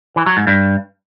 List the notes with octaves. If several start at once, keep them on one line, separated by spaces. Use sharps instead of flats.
E3
F#3
G#2
G2